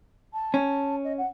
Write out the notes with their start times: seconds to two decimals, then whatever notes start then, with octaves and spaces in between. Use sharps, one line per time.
0.33 A5
0.54 C#4
1.04 D#5
1.18 F#5